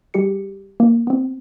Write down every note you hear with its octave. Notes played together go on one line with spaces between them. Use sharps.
G3 G4 G#4 C#7
A#3
B3 C4